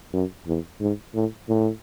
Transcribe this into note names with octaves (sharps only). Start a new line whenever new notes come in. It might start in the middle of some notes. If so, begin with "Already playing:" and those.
F#2
E2
G#2
A2
A2